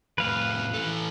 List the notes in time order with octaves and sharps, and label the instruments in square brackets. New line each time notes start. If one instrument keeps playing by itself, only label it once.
[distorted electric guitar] F2 A2 [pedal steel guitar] B4 F5
[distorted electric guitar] E3 A4